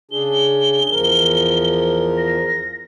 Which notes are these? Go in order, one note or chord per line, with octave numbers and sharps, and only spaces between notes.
C#3 D4 G#4 G7
E2 F3 A#4
A#6